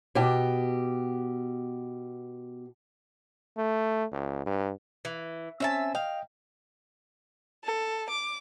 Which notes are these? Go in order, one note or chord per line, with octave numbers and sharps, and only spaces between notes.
B2 G4
A3
C#2
G2
E3
C4 C#4 E5 G#5 A5
D#5 F5 G5
A4
D6